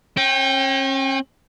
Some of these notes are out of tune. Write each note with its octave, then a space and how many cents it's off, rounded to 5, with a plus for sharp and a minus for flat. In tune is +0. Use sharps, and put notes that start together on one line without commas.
C#4 -40 G5 +0